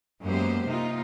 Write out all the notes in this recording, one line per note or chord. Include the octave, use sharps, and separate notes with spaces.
F#2 G#3 A#3 B3 G4 C5
C3 A#3 D#4 F4